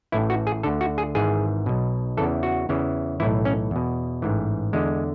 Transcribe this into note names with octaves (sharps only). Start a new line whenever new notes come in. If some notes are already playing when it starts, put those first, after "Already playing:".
A1 A2 E3 E4
F#4
G#4
D2 D3 A4
F#4
G#4
G#1 G#2 E3 G#4
B1 B2
E2 C#3 E3 A4
F#4
E2 C#3 E3
B1 A2 E3 E4
C#4
E2 B2
A1 G#2 E3
E2 D3 G#3